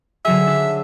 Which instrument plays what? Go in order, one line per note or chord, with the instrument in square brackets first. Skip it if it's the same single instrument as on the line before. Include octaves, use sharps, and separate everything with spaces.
[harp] D3 F#3 G#4 [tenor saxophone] E5
[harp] D4